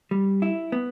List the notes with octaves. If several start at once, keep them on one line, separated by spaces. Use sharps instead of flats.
G3
E4
B3